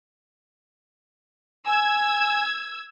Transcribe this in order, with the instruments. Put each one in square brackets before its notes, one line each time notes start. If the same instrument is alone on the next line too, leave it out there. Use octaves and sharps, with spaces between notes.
[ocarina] G#5 [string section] E6 G#6